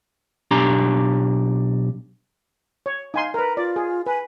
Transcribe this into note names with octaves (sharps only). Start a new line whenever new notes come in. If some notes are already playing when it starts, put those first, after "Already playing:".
B1 D4 G4 A#5
C#5
D#4 F5 G#5 C6
A#4 B4 A#5
F4 D5
G#4
B4 G#5